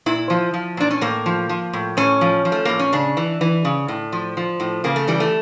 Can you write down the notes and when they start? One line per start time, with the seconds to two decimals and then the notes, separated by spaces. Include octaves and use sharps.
0.06 A#2 E4
0.30 F3
0.54 F3
0.77 A#2 D4
0.91 C#4
1.01 A2 A#3
1.26 F3
1.49 F3
1.73 A2
1.97 A2 C#4
2.21 F3
2.45 F3
2.52 A3
2.65 A2 A#3
2.79 C#4
2.93 C#3 D4
3.17 E3
3.41 E3
3.65 C#3
3.88 A2
4.12 F3
4.37 F3
4.60 A2
4.84 C#3 A#3
4.96 A3
5.08 E3 G3
5.20 A3